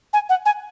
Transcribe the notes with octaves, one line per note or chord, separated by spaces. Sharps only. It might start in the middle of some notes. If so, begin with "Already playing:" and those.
G#5
F#5
G#5